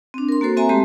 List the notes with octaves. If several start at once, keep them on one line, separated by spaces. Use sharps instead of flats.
C4 D4
A#4 C6
A#3 F#4 A4 C5
C4 E5 G#5 A#5
G#3 A3 C4 G4 A5 C6